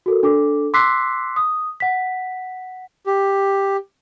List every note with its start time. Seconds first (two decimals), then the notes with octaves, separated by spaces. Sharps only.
0.06 F#4 A4 A#4
0.23 D4 A4 D6
0.74 C6 D6 E6 F#6 B6 C7
1.36 D#6
1.80 F#5 B6
3.06 G4